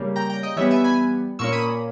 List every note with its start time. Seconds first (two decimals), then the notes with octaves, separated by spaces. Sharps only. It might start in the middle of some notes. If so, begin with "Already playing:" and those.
Already playing: C#3 G3 A#3 C#4
0.16 G5 A#5
0.30 G5 A#5
0.43 D#5 G5
0.56 E3 G3 B3 C#5 E5
0.71 E5 G#5
0.84 G#5 B5
1.39 A#2 A#3 C#4 C#6 E6
1.52 B5 D#6